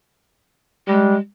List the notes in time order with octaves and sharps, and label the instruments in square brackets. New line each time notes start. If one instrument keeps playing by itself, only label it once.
[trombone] G3 [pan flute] G#3